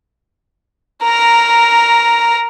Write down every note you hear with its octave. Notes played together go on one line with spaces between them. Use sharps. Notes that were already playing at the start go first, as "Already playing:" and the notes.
A#4 A#5